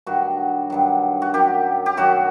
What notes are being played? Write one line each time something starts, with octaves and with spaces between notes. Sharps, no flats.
G2 D#3 F#3 F#4
G2 D#3 F#3
F#4
F#2 D#3 F#3 G4
G4
F#2 D#3 F#3 F#4